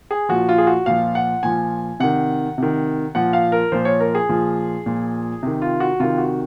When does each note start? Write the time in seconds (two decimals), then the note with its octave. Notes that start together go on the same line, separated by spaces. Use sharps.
0.11 G#4
0.29 A#2 F3 F#4
0.49 F4
0.58 G#4
0.67 F#4
0.86 A#2 F3 F5
1.15 F#5
1.43 A#2 F3 G#5
2.00 C3 D#3 F#5
2.58 C3 D#3
3.15 A#2 F3 F#5
3.33 F5
3.52 A#4
3.72 A#2 F3 C5
3.85 C#5
4.00 A#4
4.15 G#4
4.29 A#2 F3
4.86 A#2 F3
5.43 C3 D#3
5.62 F4
5.80 F#4
6.00 C3 D#3 F4
6.18 F#4